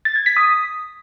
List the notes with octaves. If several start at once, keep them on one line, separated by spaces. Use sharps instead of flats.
A6
G#6
B6
D#6